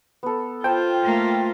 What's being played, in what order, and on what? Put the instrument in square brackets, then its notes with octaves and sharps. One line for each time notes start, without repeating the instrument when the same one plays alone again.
[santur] B3 A4
[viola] F4 [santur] C5 A5 [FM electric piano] G5
[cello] A3 A#3